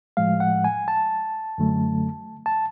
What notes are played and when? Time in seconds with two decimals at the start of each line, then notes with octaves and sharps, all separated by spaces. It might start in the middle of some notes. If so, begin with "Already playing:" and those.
0.17 A2 F3 G#3 F5
0.40 F#5
0.64 G#5
0.88 A5
1.58 F#2 D3 F#3 A3
2.46 A5